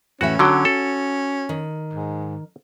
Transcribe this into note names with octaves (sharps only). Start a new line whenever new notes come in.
A2 E3 C#4 F#4 E5
D3 F#3 F#4 G5
A4
D#3
G#2